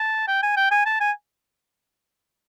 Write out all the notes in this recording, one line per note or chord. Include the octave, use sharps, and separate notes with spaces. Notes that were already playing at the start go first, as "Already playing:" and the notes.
Already playing: A5
G5
G#5
G5
G#5
A5
G#5